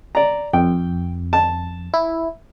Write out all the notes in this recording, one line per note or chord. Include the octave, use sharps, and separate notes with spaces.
D5 A#5
F2 G5
A5
E4